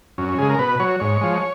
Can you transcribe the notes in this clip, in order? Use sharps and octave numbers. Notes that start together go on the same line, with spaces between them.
F#2 C#4
C#4
C#3 G#3 G#4
A#4
B2 B4
F#3 C#5
G#2 C#5
F3 G#3